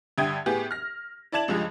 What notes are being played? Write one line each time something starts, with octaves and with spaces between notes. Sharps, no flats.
G2 D3 E5 G5 D#6 G#6
A2 B3 G4 G#4
F6 A#6
E4 D5 A5 G#6 E7 F#7
C#2 G2 F3 G#3